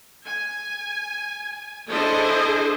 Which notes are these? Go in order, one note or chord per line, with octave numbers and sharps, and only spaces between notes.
G#5
D4 E4 G#4 A4 C5 D#5